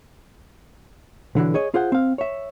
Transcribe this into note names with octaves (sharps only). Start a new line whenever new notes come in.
B1 D3 E3 F#4
G#4 C#5 D#5
F4 G#4 C5 F#5
C4 F5
C#5 E5